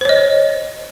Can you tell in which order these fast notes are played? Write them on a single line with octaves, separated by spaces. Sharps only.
C5 C#5 D#5